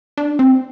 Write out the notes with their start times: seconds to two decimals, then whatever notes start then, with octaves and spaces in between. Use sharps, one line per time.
0.17 D4
0.39 C4